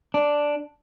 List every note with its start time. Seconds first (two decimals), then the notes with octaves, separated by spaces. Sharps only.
0.14 D4